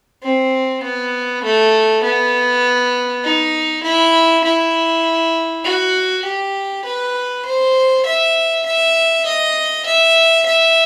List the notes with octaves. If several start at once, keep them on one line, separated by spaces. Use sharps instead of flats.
C4
B3
A3
B3
D#4
E4
E4
F#4
G4
B4
C5
E5
E5
D#5
E5
E5